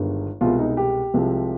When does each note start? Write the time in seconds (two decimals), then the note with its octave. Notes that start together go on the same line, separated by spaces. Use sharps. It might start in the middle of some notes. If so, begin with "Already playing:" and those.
Already playing: G1 G2 D#3 G#3 B3
0.41 C2 B2 G#3 B3 F4
0.59 D#4
0.77 G4
1.14 C2 C3 F3 G#3